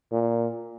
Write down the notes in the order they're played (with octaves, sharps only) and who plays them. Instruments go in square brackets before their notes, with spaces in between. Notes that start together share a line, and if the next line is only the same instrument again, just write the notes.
[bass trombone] A#2